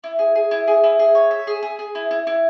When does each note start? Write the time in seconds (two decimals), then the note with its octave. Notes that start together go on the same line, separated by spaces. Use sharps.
0.04 E4
0.19 G#4
0.35 G#4
0.51 E4
0.68 G#4
0.84 E4
0.99 G#4
1.15 C#5
1.31 E5
1.47 G#4
1.63 G#4
1.79 G#4
1.95 E4
2.11 E4
2.27 E4